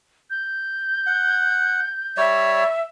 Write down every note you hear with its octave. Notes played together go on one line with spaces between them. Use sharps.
G6
F#5
G3 C#5 D5 E5